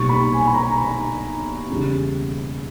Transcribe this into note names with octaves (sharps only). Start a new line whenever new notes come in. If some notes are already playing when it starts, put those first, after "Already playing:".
Already playing: B1 A#2 G3 C#6
B5
G#5
B5
A#5
B5
E2 C#3 G3